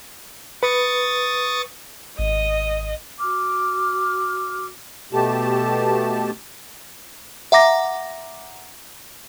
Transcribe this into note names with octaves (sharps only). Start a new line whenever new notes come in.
B4 C#6 D#6 A6
G#1 D#5
F#4 D6 F6
B2 A3 G4 A5
E5 F#5 A#5 D6 A#6